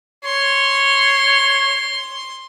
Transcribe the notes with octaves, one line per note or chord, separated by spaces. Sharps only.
C#5 C6